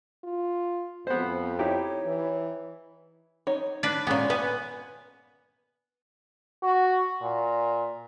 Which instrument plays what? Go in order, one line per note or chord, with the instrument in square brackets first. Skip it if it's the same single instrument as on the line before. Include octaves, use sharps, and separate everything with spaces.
[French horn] F4
[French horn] F2 [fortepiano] B3 C5
[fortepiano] D#4 E4 G4 [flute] C#5
[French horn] E3
[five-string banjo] D#4 C#5
[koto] D4 B4
[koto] A#2 B3 [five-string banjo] G#3 C#4
[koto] B3 [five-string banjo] B4 G#5
[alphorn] F#4
A#2